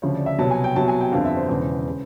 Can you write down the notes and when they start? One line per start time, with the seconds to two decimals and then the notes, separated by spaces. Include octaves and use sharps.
0.02 D2 C#3 F3 C#5
0.15 D5
0.26 E5
0.39 C2 B2 F#3 A5
0.51 G#5
0.64 G5
0.76 C2 B2 F#3 A5
0.88 G#5
1.01 G5
1.12 G1 F2 D3 F5
1.25 E5
1.37 C5
1.49 E1 E2 C#3
1.89 C#3